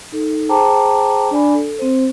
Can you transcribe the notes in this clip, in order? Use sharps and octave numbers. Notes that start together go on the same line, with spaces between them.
D#4 A4
G#4 C5 G5 A5 A#5 D6
D4 D5 G#5 B5
A4
C4 C5